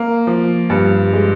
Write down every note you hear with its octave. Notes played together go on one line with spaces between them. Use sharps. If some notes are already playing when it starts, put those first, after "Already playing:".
Already playing: A#3
F3
G2
G#3